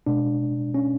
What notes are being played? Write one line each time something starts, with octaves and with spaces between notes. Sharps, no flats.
B2 G#3 D4
C#4